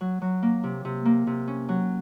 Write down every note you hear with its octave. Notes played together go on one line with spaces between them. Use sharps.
F#3
F#3
A#3
C3
C3
A#3
C3
C#4
F#3